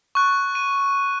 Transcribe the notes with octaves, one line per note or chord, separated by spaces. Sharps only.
C#6 F#6
D#7